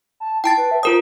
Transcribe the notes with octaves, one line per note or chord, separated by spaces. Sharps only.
A5
E4 G5 A5 A6
B4
E5
F4 A#4 C5 D#6